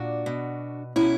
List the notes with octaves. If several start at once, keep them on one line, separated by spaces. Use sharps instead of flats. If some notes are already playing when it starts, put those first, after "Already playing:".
Already playing: A#2 D4 F#4
B2
B2 C#4 E4